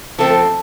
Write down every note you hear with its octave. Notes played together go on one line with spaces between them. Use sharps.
F3 A3 C4 A4